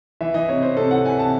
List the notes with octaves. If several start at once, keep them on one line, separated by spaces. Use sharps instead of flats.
E3 E5
E3 D#5
C3 C#5
C3 C5
C3 A4
E3 F#5
E3 G#5
C3 A5